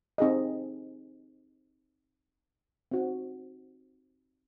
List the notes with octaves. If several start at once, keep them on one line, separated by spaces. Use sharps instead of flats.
C4 D#4 G#4 D#5
C4 D#4 F#4 C5